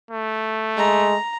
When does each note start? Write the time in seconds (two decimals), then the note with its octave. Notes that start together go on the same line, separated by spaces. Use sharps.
0.11 A3
0.77 G#3 A#5